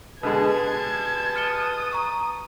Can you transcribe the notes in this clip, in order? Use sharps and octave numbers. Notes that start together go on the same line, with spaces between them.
B2 D3 G#3 B4 A5 G#6
D#6 F6 C#7 G7
A#5 C#6